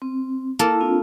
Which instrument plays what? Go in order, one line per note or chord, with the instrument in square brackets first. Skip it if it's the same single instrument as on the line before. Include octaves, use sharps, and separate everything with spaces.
[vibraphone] C4
[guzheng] A#3 A4 A#4 [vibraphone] E4
[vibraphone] C4 D4 F4